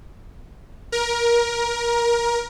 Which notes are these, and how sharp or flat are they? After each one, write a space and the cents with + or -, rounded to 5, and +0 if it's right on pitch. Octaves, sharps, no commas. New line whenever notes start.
A#4 +20